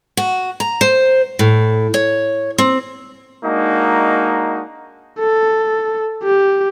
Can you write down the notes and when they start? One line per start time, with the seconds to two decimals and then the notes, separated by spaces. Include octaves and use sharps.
0.17 F#4
0.60 A#5
0.81 C5
1.39 A2
1.94 C#5
2.58 C4
3.45 G#3 A#3 D4 D#4 F#4
5.20 A4
6.23 G4